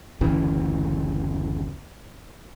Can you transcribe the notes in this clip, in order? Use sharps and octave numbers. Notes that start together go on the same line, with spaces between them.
F#1 D2 C#3 E3